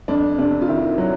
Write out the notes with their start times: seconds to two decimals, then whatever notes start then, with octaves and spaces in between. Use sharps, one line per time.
0.08 F2 D4
0.38 C3 D4
0.62 F4
0.68 D#3 E4
0.98 F#3